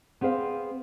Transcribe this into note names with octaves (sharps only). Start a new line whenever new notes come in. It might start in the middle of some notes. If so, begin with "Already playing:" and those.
B3 C4 G#4 C5 F5